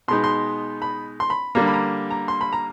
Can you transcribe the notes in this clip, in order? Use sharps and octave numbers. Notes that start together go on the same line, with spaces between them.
B2 G#3 B3 D#4 C6
C6
B5
C6
B5
D3 G3 A#3 A#5
B5
A#5
A#5
C6
B5
A#5